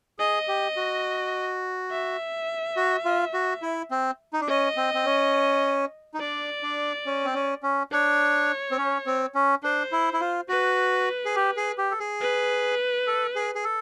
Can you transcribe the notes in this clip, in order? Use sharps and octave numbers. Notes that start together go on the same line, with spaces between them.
G#4 D#5
G4
F#4
E5
F#4
F4
F#4
E4
C4
D#4
D4
C#4 D#5
C4
C4
C#4
D#4
D4 D5
D4
C#4
C4
C#4
C#4
D4 C#5
C4
C#4
C4
C#4
D4 C5
E4
E4
F4
F#4 B4
G#4
G4
G#4
G4
A4
G#4
B4
A4
G#4
G#4
A4